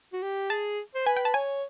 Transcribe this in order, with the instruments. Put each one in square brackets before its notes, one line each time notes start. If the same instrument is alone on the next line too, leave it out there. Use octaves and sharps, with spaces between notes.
[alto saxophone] F#4
G4
[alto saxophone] G#4 [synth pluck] A5
[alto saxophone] C5
[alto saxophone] B4 [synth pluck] G#5
[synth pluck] G5
A5
[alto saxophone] C#5 [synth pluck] G#5